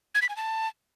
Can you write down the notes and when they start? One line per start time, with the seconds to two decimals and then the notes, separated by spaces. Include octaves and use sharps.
0.15 G#6
0.22 B6
0.29 G#5
0.37 A5